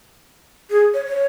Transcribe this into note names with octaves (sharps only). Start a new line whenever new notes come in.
G#4
C#5
C#5